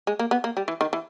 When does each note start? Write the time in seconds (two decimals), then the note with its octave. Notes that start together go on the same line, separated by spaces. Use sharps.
0.07 G#3
0.19 A#3
0.31 B3
0.44 A#3
0.57 G3
0.68 E3
0.81 D#3
0.93 E3